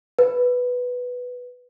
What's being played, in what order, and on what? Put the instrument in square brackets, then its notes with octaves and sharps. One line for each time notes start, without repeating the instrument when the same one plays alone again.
[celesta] B4